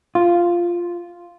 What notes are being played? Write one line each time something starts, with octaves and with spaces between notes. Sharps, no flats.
F4